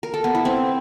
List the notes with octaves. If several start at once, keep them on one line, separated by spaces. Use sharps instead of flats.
A#4
A4
B3
E4
C4